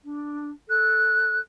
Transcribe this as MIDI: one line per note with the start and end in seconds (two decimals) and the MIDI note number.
0.04 0.48 62
0.68 1.39 69
0.68 1.39 90